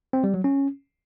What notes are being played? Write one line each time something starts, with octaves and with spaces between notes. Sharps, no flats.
C4
G3
F#3
C#4